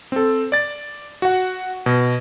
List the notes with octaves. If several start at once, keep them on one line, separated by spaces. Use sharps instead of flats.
C4 A4
D5 A6
F#4 F#5
B2